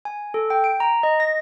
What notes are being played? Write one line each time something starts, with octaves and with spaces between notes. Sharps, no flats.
G#5
A4
G5
D7
A#5
D#5
A#6